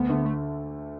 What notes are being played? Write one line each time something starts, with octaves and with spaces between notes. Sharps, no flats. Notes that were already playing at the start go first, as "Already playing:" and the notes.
Already playing: D2 B3
D3 A3
A3